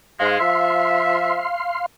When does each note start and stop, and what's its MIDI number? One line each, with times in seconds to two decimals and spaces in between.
0.20 0.37 44
0.20 0.37 56
0.20 1.86 77
0.20 1.86 84
0.40 1.45 53
0.40 1.45 76